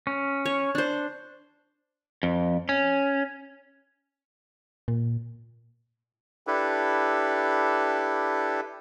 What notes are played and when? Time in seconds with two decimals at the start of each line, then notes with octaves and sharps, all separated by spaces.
0.07 C#4
0.45 C#5
0.75 D4 C5
2.23 F2
2.69 C#4
4.88 A#2
6.47 D4 E4 G4 A4 B4